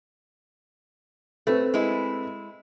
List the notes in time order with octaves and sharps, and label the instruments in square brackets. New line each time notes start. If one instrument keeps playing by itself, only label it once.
[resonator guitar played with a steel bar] A3 [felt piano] C4 A4 B4
[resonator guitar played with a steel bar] G#3 E4